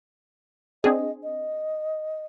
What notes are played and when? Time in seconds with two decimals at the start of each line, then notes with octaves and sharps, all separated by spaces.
0.84 C4 D4 G#4 D#5
1.23 D#5